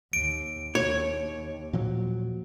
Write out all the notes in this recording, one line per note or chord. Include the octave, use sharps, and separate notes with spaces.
D#2 D7
D#2 C#5
A#2 F3 F#3